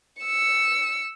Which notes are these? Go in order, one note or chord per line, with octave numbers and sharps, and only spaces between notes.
E6 C#7